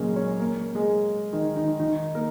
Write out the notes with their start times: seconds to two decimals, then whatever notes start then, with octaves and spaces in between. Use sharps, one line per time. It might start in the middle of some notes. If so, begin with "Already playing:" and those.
Already playing: A#2 C#3 F#3 G#3 A#3 C#4 G#4 A#4
0.16 C#4 C#5
0.40 A#3 A#4
0.75 G#3 G#4
1.33 D#3 D#4
1.56 D#3 D#4
1.80 D#3 D#4
2.15 A#3 A#4